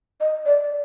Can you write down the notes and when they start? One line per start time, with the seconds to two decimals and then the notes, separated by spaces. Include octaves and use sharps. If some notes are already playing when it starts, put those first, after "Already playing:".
0.20 D#5
0.46 D5